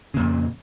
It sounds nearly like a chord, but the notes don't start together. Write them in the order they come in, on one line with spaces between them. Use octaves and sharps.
C#3 A#2 F2